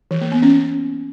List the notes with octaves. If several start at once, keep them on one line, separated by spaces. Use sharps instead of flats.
E3
A#3
B3
C#4